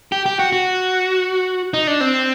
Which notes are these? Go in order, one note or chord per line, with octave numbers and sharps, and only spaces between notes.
G4
G4
F#4
F#4
D#4
D4
C4